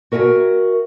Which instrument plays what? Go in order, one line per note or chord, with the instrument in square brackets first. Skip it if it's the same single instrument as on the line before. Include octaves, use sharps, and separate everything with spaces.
[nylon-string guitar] F#4 A#4 E5 G5 G#5